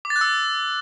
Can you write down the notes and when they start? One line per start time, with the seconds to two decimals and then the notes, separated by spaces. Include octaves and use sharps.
0.05 D6
0.10 A6
0.16 F#6
0.21 E6